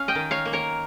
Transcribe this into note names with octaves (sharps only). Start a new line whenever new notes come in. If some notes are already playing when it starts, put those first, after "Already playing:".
Already playing: C#4 F5
D#5 G5
D#3
C#5 F5
A#3
A#4 C#5